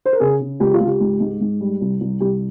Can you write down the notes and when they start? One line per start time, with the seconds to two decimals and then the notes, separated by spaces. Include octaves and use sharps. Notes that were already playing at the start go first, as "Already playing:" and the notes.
0.05 C5
0.13 A#4
0.20 C#3 G#4
0.40 C#3
0.60 C#2 G4
0.74 F4
0.80 C#2
0.87 G4
1.00 G#2
1.20 G#2
1.40 G#2
1.60 G3
1.81 C2
2.01 C2
2.20 C2 G4